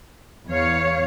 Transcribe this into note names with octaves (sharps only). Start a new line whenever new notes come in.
E2 C#5 F5